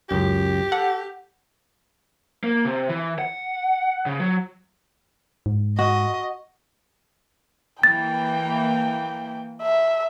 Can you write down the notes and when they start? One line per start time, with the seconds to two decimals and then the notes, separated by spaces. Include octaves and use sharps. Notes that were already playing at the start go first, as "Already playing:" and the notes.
0.09 C#2 F#2 G4 G5
0.72 A4 F#5
2.44 A#3
2.65 C3
2.89 E3
3.19 F#5
4.06 C#3
4.20 F#3
5.46 G#2
5.79 F#4 D#5
7.83 E3 A#3 G5 A6
9.62 E5